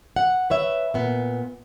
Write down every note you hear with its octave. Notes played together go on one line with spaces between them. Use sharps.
F#5
B4 C#5 E5
A#2 B3